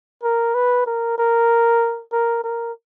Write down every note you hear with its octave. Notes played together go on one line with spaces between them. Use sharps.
A#4
B4
A#4
A#4
A#4
A#4